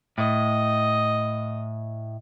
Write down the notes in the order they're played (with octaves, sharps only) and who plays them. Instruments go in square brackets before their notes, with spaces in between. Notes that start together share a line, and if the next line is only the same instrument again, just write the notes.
[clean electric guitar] A2 [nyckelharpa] D#5